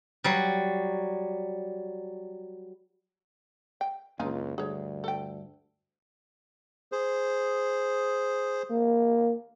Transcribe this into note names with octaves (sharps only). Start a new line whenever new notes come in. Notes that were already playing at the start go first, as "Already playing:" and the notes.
F#3 G3
G5
C#2 F#2 A#3 D4 D#4 F4 G#5
D2 G2 G#4 C#5
A4 G5
G#4 C5
A#3